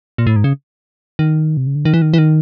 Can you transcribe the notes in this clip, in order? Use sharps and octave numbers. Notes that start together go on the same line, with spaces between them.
A#2
A2
G#2
C#3
D#3
C3
C#3
D3
D#3
E3
D#3
E3
D#3